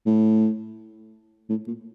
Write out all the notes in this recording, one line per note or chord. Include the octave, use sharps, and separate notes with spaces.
A2
A2
A#2